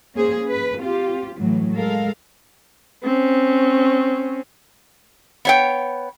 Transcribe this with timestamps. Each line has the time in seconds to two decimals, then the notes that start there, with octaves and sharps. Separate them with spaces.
0.15 A#3 C#4 G#4 C5
0.45 B4
0.78 C4 F4 G4
1.38 A2 E3 F#3 A3
1.75 G#3 A4 A#4 F5
3.03 C4 C#4
5.45 B3 C#5 G5